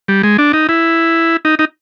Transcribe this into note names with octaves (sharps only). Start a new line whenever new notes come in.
G3
G#3
D4
D#4
E4
D#4
D#4